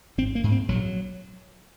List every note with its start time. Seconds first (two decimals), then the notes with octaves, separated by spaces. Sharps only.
0.18 G#1 C4
0.35 A#3
0.44 G#2
0.52 C4
0.69 A#1 F#3